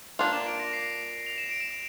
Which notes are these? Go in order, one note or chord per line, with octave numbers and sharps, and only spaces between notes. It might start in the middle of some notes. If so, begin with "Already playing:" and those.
A#3 D4 F4 F7
E7
D7
A#6
C7
F7
E7
D7
E7